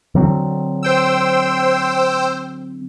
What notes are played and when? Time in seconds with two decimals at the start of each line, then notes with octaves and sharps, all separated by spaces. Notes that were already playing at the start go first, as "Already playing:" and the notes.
0.15 D3 F#3 C4
0.83 C5 G5 E6